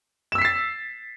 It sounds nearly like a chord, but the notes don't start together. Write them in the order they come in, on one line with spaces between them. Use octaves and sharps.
E7 E6 B6 C7 A6